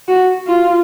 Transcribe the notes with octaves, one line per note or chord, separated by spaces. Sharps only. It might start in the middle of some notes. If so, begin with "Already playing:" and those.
F#4
F4